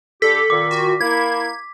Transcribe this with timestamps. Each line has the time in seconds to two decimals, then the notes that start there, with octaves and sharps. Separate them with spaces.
0.22 D3 G4 A4 B6
0.50 A#2 D#3 D6
0.71 F#4
1.01 A#3 E4 G#6